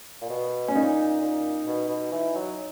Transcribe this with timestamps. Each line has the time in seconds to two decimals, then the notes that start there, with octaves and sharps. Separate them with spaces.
0.21 A#2
0.30 B2
0.68 C#4
0.75 A#2 D#4
1.21 A#2
1.67 B2
1.89 B2
2.12 E3
2.35 F#3